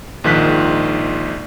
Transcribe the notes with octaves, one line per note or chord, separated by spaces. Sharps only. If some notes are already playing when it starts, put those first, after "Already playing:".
A#1 G#2 D#3 F3 F#6 B6